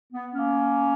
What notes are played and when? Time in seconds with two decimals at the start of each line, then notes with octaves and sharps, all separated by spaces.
0.13 B3
0.34 A#3 C#4